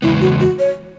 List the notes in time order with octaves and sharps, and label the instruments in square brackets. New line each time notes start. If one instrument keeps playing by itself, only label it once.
[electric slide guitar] E2 C#3 G#3 B3 [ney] E4
[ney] F#4
F#4
C#5